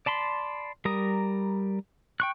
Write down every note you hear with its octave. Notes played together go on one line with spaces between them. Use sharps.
D5 A5 B5 C6
G3 A#4 A#5 D#6
G5 C#6 F#6